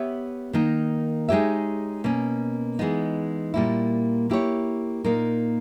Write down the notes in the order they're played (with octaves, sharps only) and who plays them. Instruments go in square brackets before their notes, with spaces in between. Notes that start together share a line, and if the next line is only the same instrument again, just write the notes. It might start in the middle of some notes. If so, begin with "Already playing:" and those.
Already playing: [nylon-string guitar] B3 G4 C#5 E5
D#3 A#3 D#4
G#3 D#4 G4 C#5 E5
B2 A#3 C#4
E3 G#3 B3 D#4
A#2 G3 A#3 E4
A#3 E4 G4 C#5
A#2 A#3 D#4 A#4